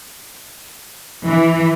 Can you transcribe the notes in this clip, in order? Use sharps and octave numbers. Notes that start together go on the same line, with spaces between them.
E3